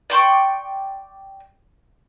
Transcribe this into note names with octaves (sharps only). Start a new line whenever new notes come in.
D5 G5 C6 C#6